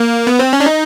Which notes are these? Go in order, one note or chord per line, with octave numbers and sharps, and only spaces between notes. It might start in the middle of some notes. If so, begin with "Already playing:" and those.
Already playing: A#3
B3
C4
C#4
D4
D#4